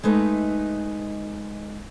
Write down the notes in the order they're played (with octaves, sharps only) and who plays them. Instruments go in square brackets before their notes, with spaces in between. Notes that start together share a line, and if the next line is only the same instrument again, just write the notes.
[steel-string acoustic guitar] G#3 A3 D#4 B4